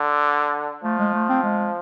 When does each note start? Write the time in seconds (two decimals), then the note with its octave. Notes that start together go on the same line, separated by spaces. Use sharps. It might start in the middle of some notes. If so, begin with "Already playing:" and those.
Already playing: D3
0.84 F3 A3
0.99 G#3
1.14 A3
1.29 C4
1.44 G#3